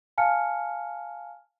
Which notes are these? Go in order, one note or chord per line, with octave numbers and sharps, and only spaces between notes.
F5 G#5 A5 F6 C#7